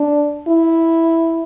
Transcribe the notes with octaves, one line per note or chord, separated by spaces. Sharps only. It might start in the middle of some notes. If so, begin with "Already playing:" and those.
Already playing: D4
E4